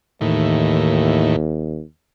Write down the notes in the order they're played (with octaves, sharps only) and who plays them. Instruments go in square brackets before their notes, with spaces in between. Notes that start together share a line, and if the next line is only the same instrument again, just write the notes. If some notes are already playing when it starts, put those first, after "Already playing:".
[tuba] D#2 [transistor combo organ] A2 D#3 E3